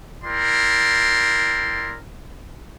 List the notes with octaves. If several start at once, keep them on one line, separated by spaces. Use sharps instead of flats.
E4 A#4 D5 G5 C6